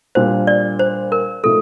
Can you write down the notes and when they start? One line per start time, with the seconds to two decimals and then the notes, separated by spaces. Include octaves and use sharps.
0.15 A#2 G3 A#3 D4 F4 C5
0.47 D5
0.79 C5
1.12 A#4
1.44 A2 F3 A3 D#4 A4